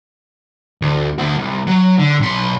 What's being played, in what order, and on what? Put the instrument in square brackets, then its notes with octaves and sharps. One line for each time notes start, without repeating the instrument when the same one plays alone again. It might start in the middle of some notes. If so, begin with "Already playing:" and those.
[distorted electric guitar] D2
D2 F#4
C2
F#3
D3
B1 C6